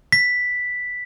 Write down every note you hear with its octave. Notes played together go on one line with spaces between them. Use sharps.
B6